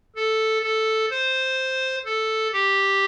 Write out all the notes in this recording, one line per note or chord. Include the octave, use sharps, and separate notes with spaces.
A4
A4
C5
A4
G4